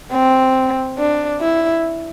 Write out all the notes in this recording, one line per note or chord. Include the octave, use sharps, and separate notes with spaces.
C4
D4
E4